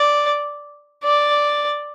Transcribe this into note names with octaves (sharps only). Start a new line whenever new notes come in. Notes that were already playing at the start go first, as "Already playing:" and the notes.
Already playing: D5
D5